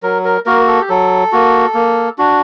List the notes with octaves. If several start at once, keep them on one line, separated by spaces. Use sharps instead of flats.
F#3 A#4
A#4
A#3 F#4 A#4
A4
G4
F#3 A4
A#3 F#4
A#3
D4 F#4